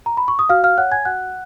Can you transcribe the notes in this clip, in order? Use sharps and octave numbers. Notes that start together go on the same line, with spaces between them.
A#5
B5
C#6
D#6
F#4 F5 F6
F5 F6
C#5 F#5 F#6
G#5 G#6
F#4 F#5 F#6